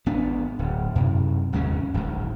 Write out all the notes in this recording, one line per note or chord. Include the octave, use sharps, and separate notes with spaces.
G#1 B3 D4
D1
F#2 C3
G1 D#2 G#3 C#4
D1 G#1 D2 G#2